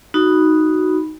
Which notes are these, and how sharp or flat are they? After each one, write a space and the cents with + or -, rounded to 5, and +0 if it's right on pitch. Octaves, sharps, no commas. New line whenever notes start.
D#4 +0 F#4 +0 B5 +0